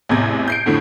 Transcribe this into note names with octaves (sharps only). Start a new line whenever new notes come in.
A1 E2 C3 G#6
G6 C7 D7
F2 A2 D3